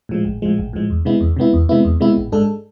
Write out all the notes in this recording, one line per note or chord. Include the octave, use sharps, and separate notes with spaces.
A2 F3 G#3
A1
A2 F3 G#3
A1
A2 F3 G#3
E2
C3 G#3 B3 E4
E2
C3 G#3 B3 E4
E2
C3 G#3 B3 E4
E2
C3 G#3 B3 E4
A1
G#2 G#3 D4 A4